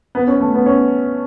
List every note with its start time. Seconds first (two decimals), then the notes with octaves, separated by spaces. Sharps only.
0.15 B3
0.27 C#4
0.40 A3
0.54 B3
0.66 C#4